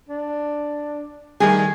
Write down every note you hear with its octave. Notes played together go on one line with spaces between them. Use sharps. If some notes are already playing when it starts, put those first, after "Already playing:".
D4
D#3 G3 A3 G#4 G#5